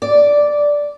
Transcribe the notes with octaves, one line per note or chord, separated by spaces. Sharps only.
D5